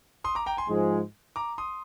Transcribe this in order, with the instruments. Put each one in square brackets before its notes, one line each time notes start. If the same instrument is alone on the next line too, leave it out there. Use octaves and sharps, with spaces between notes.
[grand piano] C6 D#6
A#5 D6
G5 A#5
G#5 C6
[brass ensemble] G#2 F3 G#3
[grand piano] A#5 D6
C6 D#6